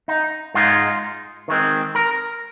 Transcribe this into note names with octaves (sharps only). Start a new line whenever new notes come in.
D#4
G#2 G#3 D#4 F4
D#3 G#3 C4
A#4